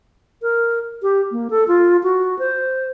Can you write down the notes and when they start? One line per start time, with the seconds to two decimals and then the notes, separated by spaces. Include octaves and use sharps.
0.42 A#4
1.03 G4
1.32 A#3
1.50 A4
1.68 F4
2.03 F#4
2.39 C5